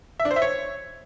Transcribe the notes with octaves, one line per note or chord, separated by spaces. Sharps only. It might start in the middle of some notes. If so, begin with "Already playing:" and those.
E5
D4
C5
E5
C#5